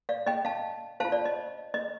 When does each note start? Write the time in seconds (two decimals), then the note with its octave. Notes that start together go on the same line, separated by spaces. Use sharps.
0.09 D5 F5
0.27 D#5 G5
0.45 F5 A5
1.00 F4 C5 F5 A5
1.12 D5
1.25 D#5
1.74 D#5